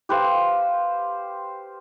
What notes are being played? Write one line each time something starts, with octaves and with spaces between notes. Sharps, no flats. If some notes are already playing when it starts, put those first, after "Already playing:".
G4 B4 C5 F5